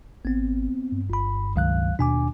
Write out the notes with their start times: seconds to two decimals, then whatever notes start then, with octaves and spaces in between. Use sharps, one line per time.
0.25 G#1 B3 C4
0.92 G2
1.10 G1 B5
1.56 C#2 D#3 F#3 F5 F#6
1.99 D#2 B2 D4 G#5 D6